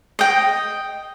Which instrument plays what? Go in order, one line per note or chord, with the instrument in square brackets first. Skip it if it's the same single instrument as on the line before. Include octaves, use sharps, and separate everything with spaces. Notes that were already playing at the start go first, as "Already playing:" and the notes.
[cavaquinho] D#5 G5